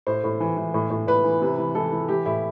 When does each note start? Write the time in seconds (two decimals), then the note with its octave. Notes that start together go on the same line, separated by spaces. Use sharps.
0.07 A2 C5
0.24 A2
0.40 E3
0.57 E3
0.74 A2
0.90 A2
1.07 A2 B4
1.24 E3
1.42 C3
1.58 E3
1.75 E3 A4
1.92 E3
2.08 E3 G4
2.26 A2 E4